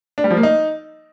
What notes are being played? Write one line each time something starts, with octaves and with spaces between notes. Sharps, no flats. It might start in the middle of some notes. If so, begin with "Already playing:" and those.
D4
G3
F3
A#3
D#4